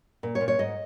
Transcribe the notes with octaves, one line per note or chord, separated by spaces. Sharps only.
A#2
C#5
A#2
C#5
G#2 D#5